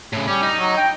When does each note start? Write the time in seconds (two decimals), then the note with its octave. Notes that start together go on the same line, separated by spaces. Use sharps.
0.13 A2 C#3
0.28 G3 C#4
0.43 D#4
0.59 F#3
0.78 G5